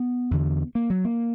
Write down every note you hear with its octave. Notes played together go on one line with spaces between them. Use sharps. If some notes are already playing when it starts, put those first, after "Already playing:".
Already playing: B3
E2 D3
A#3
F#3
A#3